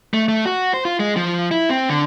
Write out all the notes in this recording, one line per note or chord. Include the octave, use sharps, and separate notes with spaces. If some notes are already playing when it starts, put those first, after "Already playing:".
A3
A3
F#4
C5
F4
G#3
F3
E4
C4
D3